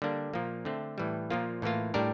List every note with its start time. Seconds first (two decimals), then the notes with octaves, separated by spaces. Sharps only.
0.02 D3 G3 A#3 D4
0.34 A#2 F3 A#3
0.65 D3 A3 C4
0.98 A2 E3 G3
1.30 A#2 F3 A#3 F4
1.62 A2 E3 A#3 F4
1.94 A2 G3 D4 G4 A#4